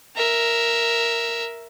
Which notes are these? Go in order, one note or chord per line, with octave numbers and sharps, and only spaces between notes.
A#4 E5